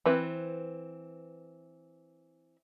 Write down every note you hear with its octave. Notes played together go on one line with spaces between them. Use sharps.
E3 C4 B4